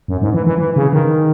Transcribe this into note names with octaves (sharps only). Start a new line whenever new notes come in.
F#2
G#2
E3
E3
E3
C#3
D#3